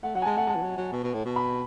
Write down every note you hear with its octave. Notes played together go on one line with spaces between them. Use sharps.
A3 F#5
F#3 F#5
G#5
G#3 A5
A3 F#5
G#3 A5
E3
F#3
F#3
B2
B2
A2
B2
B5